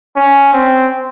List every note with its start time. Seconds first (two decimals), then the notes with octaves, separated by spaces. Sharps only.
0.16 C#4
0.53 C4